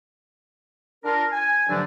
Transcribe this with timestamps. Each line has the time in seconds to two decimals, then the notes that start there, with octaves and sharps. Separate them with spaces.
1.05 D4 F4 A#4
1.32 G#5
1.69 G2 D3 F3 F#3 A3 D4